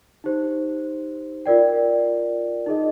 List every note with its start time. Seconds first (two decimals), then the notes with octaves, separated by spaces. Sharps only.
0.24 D#4 G4 C5
1.46 F4 A#4 D5 G5
2.66 D#4 G#4 D#5